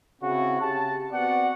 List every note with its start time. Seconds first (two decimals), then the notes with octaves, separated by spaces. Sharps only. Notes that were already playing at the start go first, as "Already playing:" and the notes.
0.22 C#3 C4 E4 F#4
0.61 C#3 G4 A5
1.12 B3 C4 F#4 D5 F#5